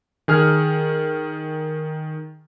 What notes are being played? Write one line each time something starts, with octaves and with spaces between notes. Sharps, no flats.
D#3 G#4 F6